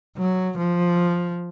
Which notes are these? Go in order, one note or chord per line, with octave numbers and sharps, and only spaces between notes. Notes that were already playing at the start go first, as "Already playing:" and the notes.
F#3
F3